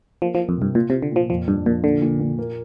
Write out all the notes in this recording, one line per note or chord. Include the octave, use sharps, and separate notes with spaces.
F3 A#3
F3
F4
F2
G2 C3
A#2 F4
C3
F4
D3
A#2 F3
F2 F3
G2 D4
A#2 F3
A#2 D3
A#2
A#2
A#3